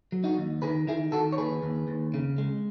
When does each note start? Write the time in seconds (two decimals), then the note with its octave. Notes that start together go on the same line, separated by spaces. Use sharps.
0.12 F#3
0.24 D#4 F#4
0.37 D#2
0.62 D#3 G#4 B4
0.87 D#3 E4 G#4
1.12 D#3 F#4 A4
1.32 C#5
1.38 D#2 G#4 B4
1.63 D#2
1.88 D#2
2.14 C#3
2.38 G#3